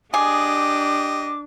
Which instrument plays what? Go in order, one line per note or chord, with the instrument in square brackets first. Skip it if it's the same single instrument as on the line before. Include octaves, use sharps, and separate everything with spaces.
[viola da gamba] D4 [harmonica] G4 D#5 [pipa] G#4 [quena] D6